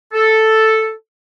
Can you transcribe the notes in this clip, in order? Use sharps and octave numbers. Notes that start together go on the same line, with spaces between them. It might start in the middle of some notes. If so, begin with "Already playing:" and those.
A4